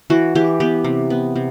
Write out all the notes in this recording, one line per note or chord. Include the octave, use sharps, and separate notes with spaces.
E3 F#4
E3 G4
B3 G4
C3
B3
C3